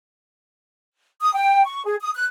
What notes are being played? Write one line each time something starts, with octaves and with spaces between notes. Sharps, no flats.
D#6
G5
C#6
G#4
D#6
F#6